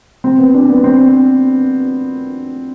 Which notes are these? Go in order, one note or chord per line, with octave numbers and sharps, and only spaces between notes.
C4
B3
D4
B3
C4